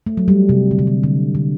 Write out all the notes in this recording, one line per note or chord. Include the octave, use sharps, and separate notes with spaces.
A3
F#3
G3
C3
D3
C3
D3
D3
D3